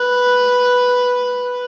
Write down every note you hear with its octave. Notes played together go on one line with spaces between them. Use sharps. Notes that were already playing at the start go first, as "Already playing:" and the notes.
Already playing: B4